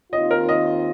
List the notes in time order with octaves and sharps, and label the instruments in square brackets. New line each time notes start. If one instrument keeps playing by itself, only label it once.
[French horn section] D#2 D#3 C4 F4 [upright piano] D#5
[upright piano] A#4
D#5